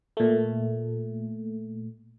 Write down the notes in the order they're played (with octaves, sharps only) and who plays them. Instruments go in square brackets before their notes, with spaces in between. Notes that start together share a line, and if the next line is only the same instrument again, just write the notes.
[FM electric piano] A#2 A3